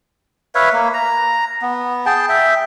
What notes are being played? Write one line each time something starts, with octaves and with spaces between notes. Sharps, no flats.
B4 C#5 E5 F5
A#3
A#5
B3
G#4 G5 A5
E5 G5